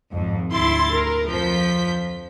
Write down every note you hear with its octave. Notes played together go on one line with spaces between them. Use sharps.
G#1 F2
D2 E4 C6 A6
A#4
F2 F3 G6 B6